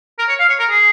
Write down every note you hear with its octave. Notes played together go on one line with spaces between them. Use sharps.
A#4
C#5
F5
C#5
A#4
G#4